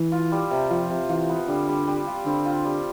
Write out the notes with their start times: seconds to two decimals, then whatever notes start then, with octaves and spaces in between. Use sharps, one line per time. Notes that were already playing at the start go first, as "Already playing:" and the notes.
Already playing: E3
0.12 F4
0.32 G3
0.51 C3
0.70 F3 F4
0.90 C3
1.09 E3 F4
1.29 B3
1.48 D3 G3
1.68 G3
1.87 G3
2.07 F4
2.26 D3 C4
2.46 F4
2.65 G3